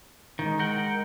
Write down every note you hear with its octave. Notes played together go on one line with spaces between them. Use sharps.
D#3 G#3
A#4 F#5 G5